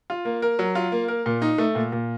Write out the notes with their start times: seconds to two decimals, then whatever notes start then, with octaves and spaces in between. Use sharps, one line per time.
0.10 F4
0.25 A#3
0.42 A#4
0.59 F#3
0.75 F4
0.92 A#3
1.08 A#4
1.26 A#2
1.42 D#4
1.58 A3
1.75 A#2
1.92 A#2